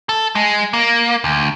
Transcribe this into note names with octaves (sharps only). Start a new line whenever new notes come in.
A4
G#3
A#3
D2